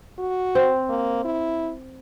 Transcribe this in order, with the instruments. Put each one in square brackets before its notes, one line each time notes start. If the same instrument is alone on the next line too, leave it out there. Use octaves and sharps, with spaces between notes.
[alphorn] F#4
[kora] C4
[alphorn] A#3
E4